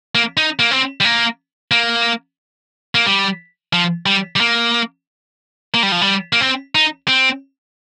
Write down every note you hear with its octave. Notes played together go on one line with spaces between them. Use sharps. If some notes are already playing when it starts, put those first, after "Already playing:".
A#3
D#4
A#3
C4
G3
A#3
A#3
A#3
G3
F3
G3
G3
A#3
A#3
G3
F3
G3
A#3
C4
D#4
C4